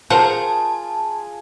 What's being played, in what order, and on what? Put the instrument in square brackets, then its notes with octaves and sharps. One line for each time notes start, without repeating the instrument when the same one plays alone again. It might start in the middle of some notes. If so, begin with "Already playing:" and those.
[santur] F4 G#4 [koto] A#4 C5 F#5 [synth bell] A5